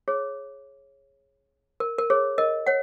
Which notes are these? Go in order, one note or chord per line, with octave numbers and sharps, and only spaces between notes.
G#4 C#5
A#4
A#4
G#4 C#5
A#4 D#5
C#5 F#5